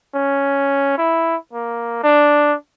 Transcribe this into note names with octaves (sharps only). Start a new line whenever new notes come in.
C#4
E4
A#3
D4